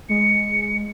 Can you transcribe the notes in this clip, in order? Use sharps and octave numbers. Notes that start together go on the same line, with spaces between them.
G#3 C#7